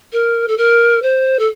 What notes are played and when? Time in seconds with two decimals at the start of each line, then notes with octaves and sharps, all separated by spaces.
0.13 A#4
0.48 A4
0.58 A#4
1.02 C5
1.39 A4